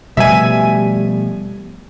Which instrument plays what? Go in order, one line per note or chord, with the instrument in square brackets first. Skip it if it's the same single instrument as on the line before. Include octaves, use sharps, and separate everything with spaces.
[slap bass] B2 F3 A3 [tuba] G3 [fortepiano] E5 G#5